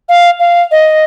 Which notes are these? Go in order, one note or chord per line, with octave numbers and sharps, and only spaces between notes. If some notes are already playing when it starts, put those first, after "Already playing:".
F5
F5
D#5